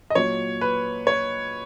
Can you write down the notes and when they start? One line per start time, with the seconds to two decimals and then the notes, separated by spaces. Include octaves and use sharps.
0.10 D#5
0.15 A#2 F#3 C#5
0.61 B4
1.07 C#5